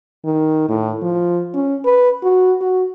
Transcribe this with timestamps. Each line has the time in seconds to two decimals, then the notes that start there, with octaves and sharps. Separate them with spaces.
0.25 D#3
0.69 A2
1.02 F3
1.54 C#4
1.85 B4
2.23 F#4
2.61 F#4